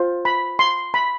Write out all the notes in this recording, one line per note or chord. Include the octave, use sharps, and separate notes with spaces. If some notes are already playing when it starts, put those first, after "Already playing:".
Already playing: F4 C5
B5
C6
B5